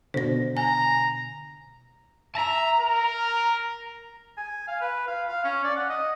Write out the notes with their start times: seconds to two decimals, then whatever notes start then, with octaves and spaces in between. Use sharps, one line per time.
0.14 B2 D3 C5 A#6
0.57 G#5 A#5
2.35 E5 A5 A#5
2.79 A#4
4.37 G#5
4.68 F5
4.81 B4
5.07 F5
5.28 F5
5.44 C#4
5.64 D5
5.76 F#5
5.89 D#5